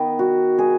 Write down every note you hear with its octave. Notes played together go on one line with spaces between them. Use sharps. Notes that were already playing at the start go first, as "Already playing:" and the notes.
Already playing: D#3 B3
F#4
G#4